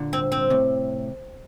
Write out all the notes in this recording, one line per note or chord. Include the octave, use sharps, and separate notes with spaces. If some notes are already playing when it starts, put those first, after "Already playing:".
Already playing: A#2 D3
C4
C4
A2 C3